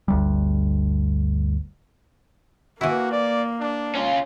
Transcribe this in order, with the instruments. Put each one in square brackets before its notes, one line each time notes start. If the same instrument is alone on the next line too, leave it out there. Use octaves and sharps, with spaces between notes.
[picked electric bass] G1 D2 G3
[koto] E3 E4 [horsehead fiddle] A#3 [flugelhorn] F#4
[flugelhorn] D5
D4
[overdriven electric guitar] C#4 F4